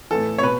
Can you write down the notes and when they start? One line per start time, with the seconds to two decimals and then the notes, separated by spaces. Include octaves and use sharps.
0.10 A2 E3 A4
0.38 C#5
0.43 B2 B4